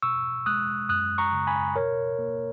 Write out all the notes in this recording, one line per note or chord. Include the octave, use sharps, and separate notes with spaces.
B2 C#6 E6
G#3 D#6 F#6
F#2 D#6 F#6
A#5 C#6
C#3
G#5 B5
B2 A#4 C#5
A#3